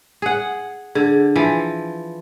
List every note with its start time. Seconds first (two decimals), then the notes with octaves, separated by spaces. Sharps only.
0.22 G#4 F#5
0.95 D3 G#4
1.36 E3 F3